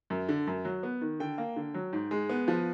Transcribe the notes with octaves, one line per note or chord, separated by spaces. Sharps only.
F#2
D3
F#2
F#3
B3
D#3
D3 G5
A#3
D3
F#3
G#2
G#3
B3
F3